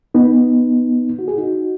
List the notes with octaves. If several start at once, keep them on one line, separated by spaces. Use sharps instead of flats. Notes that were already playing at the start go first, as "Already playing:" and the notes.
B3 D#4
F#4
G#4
D#4 F#4